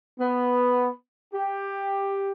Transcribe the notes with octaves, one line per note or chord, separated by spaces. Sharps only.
B3
G4